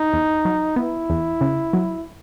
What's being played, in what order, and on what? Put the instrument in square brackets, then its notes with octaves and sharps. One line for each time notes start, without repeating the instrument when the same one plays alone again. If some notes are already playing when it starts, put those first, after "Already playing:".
Already playing: [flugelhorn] D#4
[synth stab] E2
F#3
[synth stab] B3 [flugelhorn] E4
[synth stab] E2
C#3
F#3